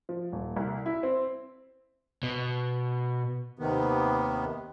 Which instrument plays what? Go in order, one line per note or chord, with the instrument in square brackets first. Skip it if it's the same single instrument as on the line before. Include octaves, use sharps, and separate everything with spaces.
[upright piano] F3
D#1
C2
E4
C4
[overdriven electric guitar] B2
[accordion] D#2 C3 D#3 B3